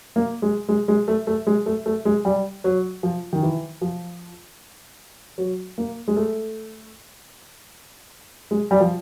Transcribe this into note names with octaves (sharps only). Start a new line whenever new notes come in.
A#3
G#3
G#3
G#3
A3
A3
G#3
A3
A3
G#3
G3
F#3
F3
D#3
E3
F3
F#3
A#3
G#3
A3
G#3
G3
F3